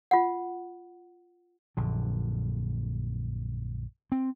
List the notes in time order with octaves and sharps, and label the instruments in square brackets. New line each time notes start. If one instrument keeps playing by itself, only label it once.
[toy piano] F4 F#5
[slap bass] A#1 F#2 D3
C4